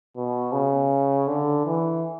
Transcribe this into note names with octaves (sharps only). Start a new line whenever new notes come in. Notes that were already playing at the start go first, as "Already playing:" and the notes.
B2
C#3
D3
E3